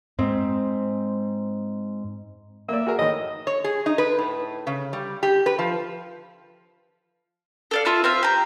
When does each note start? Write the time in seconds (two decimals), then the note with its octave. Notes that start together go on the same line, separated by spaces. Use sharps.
0.19 G#2 C4
2.69 A#3 D5 E5
2.87 F#4 G#4 A#4
2.99 A2 D#3 D#5
3.47 C#5
3.64 G#4
3.86 D#4
3.98 B4
4.18 A2
4.67 C#3
4.93 G3
5.23 G4
5.46 B4
5.59 F3
7.71 A4 D5 F5
7.85 F4 E5 A5 E6
8.04 C4 E5 F5
8.23 G4 A#5